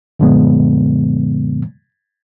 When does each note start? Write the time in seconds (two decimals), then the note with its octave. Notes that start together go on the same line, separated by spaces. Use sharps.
0.19 F#2 A#2 D3 F3 G#3 B3